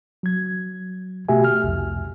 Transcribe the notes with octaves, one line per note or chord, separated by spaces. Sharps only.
F#3 G#6
B2 A3 F#4 G4 E5 G#5
F6
C2 F2